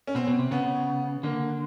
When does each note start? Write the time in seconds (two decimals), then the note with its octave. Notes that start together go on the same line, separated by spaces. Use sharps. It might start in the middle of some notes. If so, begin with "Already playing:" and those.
0.07 C#4
0.15 B2 C4
0.28 B2
0.39 C3
0.51 C#3 B3
1.23 D3 A#3